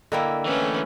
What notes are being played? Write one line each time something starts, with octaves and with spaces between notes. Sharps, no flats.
D3 A#3 E4 D#5 G5
E3 A3 C#4 B4